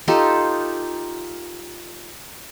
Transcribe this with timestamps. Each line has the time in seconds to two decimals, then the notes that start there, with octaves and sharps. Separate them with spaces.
0.08 D#4 F4 G4 A4